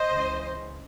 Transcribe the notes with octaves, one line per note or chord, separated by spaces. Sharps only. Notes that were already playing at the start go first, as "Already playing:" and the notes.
Already playing: C5 D#5
C#2 C#3 E3